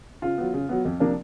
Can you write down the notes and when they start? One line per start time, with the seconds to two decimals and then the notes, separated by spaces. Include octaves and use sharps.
0.22 C#3 F4
0.38 F#3 B3
0.53 C#3
0.69 F#3 B3
0.85 F2
1.00 C3 F3 A#3 D4